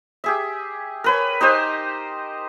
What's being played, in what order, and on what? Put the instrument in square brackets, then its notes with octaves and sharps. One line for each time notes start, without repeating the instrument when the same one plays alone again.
[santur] G4 G#4 E5
A#4 B4 C#5
D#4 G4 C5 D#5